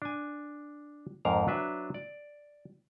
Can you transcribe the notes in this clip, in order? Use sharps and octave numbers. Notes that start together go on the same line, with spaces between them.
D4 G#5
F2 G#2 A#4 F5 A#5
F#3 D4 B4 E5
D5